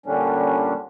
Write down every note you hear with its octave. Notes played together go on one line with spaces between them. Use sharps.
A#2 D3 G3 C#4 D4